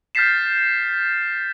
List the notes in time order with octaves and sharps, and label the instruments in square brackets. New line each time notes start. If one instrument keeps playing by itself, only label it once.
[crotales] F6 G6 A6 B6 C7 E7